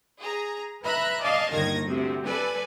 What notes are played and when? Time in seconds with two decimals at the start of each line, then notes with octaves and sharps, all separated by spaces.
0.19 G#4 A#5
0.83 B4 E5 A#5 B5 F#6
1.22 D5 D#5 F5 G#5 A5
1.52 G1 D#2 D#3 G#6 A#6
1.83 D2 C3
2.25 A4 B4 D5 G#5